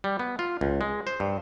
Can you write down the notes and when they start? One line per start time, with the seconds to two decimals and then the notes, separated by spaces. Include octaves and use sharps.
0.04 G3
0.19 B3
0.39 F4
0.61 C#2
0.81 G#3
1.07 C5
1.20 G2